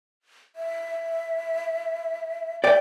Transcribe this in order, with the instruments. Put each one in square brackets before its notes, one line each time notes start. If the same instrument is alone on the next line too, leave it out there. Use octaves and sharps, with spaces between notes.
[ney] E5
[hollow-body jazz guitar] D5 G5 [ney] E5